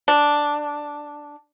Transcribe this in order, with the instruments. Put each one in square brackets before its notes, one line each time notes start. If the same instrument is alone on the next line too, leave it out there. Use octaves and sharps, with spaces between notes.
[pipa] D4